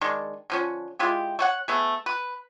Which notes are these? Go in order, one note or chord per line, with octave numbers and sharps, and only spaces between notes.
D#3 G#3 D4
D3 F3 C#4
G#3 E4 F4 G4
A3 C#5 F#5
A3 B3 G#4
B4